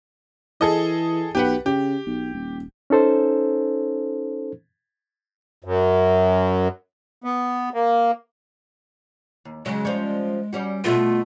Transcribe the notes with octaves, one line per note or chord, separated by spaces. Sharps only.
E3 G#4 A4 D#5
B1 G4 B4 F#5
C#3 G4
B1
D#1
C#4 D#4 A4 C5
F#2
B3
A#3
D#2
C#3 F#3 G#3
F3 G3 C#4
G3 C#4 F#4
B2 A3 B3 F4